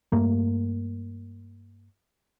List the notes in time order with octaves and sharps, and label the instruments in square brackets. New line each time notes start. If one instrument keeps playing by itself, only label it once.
[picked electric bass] G2 A3 A#3